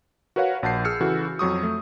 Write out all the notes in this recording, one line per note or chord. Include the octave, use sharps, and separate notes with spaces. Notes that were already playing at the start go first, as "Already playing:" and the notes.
F#4 A#4 B4 C#5 F5 F#5
A#1 F#5 A5 G6 C7
G#4 E6 F6 C#7
C#3 E3 F#4 A4
F2 F#3 C#6 D#6
A3